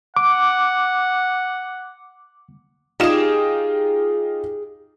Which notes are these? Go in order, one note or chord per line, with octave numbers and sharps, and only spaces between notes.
F#5 D6
D#4 F4 G4 G#4 E7